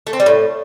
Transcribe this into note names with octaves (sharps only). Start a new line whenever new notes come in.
A3
C4
G3
A2